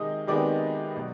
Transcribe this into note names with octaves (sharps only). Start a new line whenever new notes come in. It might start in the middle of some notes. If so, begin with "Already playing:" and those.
Already playing: C3 D#3 G#3 D#4 D#5 D#6
C3 D#3 G#3 B3 D#4 D5 D6
B2 F#3